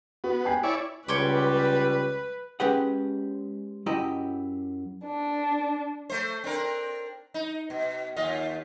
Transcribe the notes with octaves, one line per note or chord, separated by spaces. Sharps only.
B3 F#4
G5 G#5 C7
E4 C#5 D5
C#2 G3 B4 C#5 C6 D6
G#3 C#4 G4 B4 F#5
F#2 E4 G4 D#5 A#5
D4
A3 C5
C4 D4 A#4
D#4
B2
D#2 F4 D#5